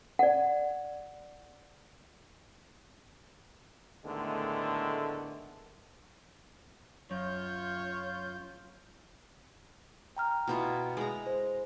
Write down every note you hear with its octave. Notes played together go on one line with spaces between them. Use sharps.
D5 F#5
A2 D3 D#3 G#3 A3 B3
F#2 F4 C#5 G6
G5 A#5 F6
B2 E4 F4
G#3 A#5
C5